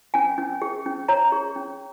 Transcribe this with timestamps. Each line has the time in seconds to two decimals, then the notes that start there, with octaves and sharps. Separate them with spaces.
0.14 C#4 G#5
0.38 C#4
0.62 G#4
0.86 C#4
1.08 C#5 A#5
1.32 G#4
1.56 C#4